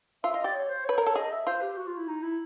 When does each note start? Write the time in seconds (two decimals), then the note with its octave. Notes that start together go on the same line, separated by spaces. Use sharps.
0.24 F4 E5
0.34 F4 D#5
0.44 G4 D5
0.54 C#5
0.70 C5
0.85 B4 C#5
0.98 A#4 C#5
1.06 A4
1.15 G#4 D#5
1.32 E5
1.47 F4 C5
1.62 G4
1.77 F#4
1.87 F4
1.97 E4
2.08 D#4
2.22 E4